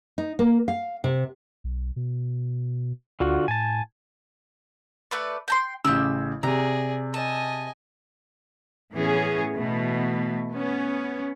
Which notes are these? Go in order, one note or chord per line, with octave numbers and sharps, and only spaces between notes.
D#4
A#3
F5
C3
B1
B2
D2 D3 F4 F#4
A2 G#5 A5
A3 B4 D5
G5 A5 C6
A1 C#3 G4 E6
C3 G#4 D5 A#5
D#5 G#5 A5
A2 E3 B3 C#4 G#4
B2 E3 A3
B3 C#4